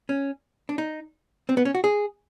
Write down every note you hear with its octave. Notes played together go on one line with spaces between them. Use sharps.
C#4
D4
D#4
C4
B3
C#4
F#4
G#4